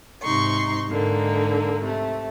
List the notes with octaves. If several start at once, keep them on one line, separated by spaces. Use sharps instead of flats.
G#2 C3 D#4 C6 C#6
G#2 D3 A#3 D#4
C3 A3